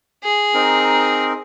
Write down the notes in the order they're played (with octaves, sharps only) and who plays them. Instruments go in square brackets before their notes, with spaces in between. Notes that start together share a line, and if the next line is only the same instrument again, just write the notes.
[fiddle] G#4
[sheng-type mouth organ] C4 D#4 A#4